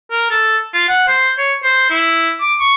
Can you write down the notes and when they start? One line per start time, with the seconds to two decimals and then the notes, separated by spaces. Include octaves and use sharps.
0.11 A#4
0.31 A4
0.73 F4
0.89 F#5
1.08 C5
1.38 C#5
1.64 C5
1.90 E4
2.41 D6
2.60 C#6